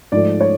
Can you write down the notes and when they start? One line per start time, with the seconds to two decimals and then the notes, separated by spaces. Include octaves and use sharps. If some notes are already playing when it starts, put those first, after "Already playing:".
0.12 G#2 F3 A3 D5
0.41 C#5